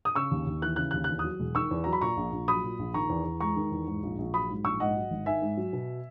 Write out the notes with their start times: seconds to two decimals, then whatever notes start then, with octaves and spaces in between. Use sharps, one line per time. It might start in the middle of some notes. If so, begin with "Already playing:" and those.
0.05 D#6
0.15 C#3 C#6 E6
0.31 D#2
0.47 D#2
0.62 E3 F#6
0.76 C#3 F#6
0.91 F#6
0.94 D#2
1.04 F#6
1.09 E2
1.19 D#6 F#6
1.25 F#3
1.40 E1
1.55 D#3 C#6 E6
1.71 E2
1.84 F#3 A#5
1.93 B5
2.01 A#2 A#5 C#6
2.17 A#1
2.32 A#1
2.48 F#3 B5 D#6
2.64 A#2
2.79 A#1
2.94 D#3 A#5 C#6
3.09 E2
3.25 E2
3.40 G#3 A#5 C#6
3.56 D#3
3.71 E2
3.87 G#2
4.03 A#1
4.18 A#1
4.33 F#3 B5 D#6
4.49 G#2
4.65 A#1 C#6 E6
4.80 G#2 D#5 F#5
4.96 F#3
5.11 G#1
5.26 D#3 E5 G#5
5.42 G#2
5.57 F#3
5.73 B2